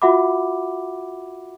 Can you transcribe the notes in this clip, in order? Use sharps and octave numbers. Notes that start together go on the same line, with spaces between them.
F4 F#4 E5 F#5 B5 D6